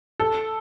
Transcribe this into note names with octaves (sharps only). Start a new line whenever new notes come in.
A4